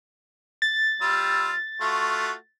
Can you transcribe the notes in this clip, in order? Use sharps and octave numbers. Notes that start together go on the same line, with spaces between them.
A6
G3 F4 E6
A3 F4 F#4